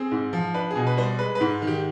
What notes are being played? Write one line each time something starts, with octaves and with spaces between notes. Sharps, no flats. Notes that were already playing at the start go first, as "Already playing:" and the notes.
Already playing: C4 G#4
G#2
F3
D4 B4
G#4
B2
B4
G3 C5
D5
G#3 B4
B4
G#2
D#3
G4